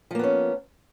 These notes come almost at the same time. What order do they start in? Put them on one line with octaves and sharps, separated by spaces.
F3 A#3 B3 C#4